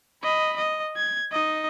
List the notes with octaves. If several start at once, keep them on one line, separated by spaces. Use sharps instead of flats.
D#5 B5
D#5
G#6
D#4 D#5